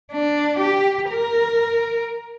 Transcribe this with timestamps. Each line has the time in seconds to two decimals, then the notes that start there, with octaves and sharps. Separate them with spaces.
0.12 D4
0.60 G4
1.10 A#4